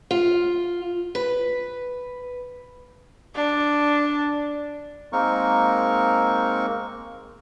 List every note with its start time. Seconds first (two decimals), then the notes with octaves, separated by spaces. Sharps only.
0.11 F4
1.15 B4
3.35 D4
5.13 G#3 A#3 C4 D#4 A#4 C#6